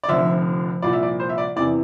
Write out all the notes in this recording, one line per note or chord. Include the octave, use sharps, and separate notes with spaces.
D5
F1 F2 D3 F3 E5
C2 A#2 F3 D5
E5
D5
C5
E5
D5
E2 C3 E3 D5